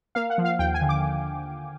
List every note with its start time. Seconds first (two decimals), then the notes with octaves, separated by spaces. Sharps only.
0.15 A#3 F5
0.30 F#5
0.38 F3
0.45 F5
0.59 D#2 G5
0.74 G#5
0.81 D3
0.89 D6